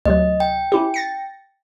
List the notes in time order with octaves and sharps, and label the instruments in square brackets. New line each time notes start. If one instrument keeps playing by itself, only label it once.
[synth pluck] D2 C3 F#3 [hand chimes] D#5
[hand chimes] G5
[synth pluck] C#4 E4 G4
A6 A#6 C#7